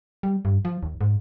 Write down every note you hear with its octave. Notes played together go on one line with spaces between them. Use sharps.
G3
G2
F3
D#2
G#2